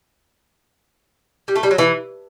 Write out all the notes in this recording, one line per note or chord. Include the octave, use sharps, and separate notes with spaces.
G3
A3
G3
F#3
E3